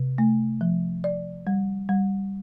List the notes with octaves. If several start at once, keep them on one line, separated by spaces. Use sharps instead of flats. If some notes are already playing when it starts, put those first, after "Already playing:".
Already playing: C3
A3
F3
D5
G3
G3